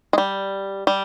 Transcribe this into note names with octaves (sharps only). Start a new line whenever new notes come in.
G#3
G3
G3